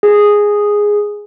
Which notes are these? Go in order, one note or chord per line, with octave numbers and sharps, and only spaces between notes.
G#4